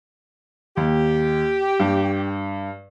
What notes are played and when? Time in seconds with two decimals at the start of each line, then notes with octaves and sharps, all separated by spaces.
0.77 D#2 G4
1.80 G2